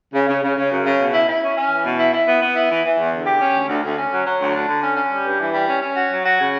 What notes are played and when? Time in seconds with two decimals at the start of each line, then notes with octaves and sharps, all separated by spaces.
0.14 C#3
0.29 C#3
0.44 C#3
0.57 C#3
0.71 F#2
0.86 C#3
0.99 B2
1.14 E4
1.29 E4
1.43 C#4
1.57 C#4
1.71 E3
1.85 B2
1.99 E4
2.13 E4
2.27 B3
2.42 B3
2.56 E4
2.70 E3
2.85 E3
2.98 E2
3.13 D3
3.27 G4
3.41 C#4
3.55 D2
3.69 D2
3.84 D2
3.98 C#4
4.12 F#3
4.26 F#3
4.41 D2
4.55 D4
4.68 D3
4.83 C#4
4.97 C#4
5.12 G3
5.25 G2
5.40 E3
5.54 G3
5.68 C#4
5.82 C#4
5.96 F#4
6.10 F#3
6.25 F#4
6.39 C#3